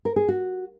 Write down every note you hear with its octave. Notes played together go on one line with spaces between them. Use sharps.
A#4
G#4
F#4